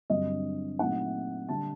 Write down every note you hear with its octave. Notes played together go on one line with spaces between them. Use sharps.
G2 D3 F#3 C4 D#5
A#2 F#3 A3 C4 D#4 F#5
D3 G3 D4 A5